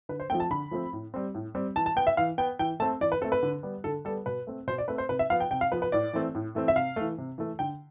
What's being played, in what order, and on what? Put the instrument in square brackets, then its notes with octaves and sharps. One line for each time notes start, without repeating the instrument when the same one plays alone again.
[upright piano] D3 B4
C5
F3 A3 C4 G5
A5
D3 B5
F3 A3 C4
A2
G3 C4
A2
G3 C4
E3 A5
A5
B3 G5
E5
E3 F5
B3 G5
E3 G5
A3 C4 A5
E3 D5
B4
C4 A4
A3
B4
D3
G3 B3
D3 A4
G3 B3 A4
B2 B4
A3 C4
B2 C5
D5
A3 C4 B4
C5
C3 B4
E5
F3 B3 F5
G5
C3 G5
F5
F3 B3 B4
B4
A2 D5
E3 A3 C4
A2
E3 A3 C4
E5
C3 F5
E3 A3
C3
E3 A3
D3 G5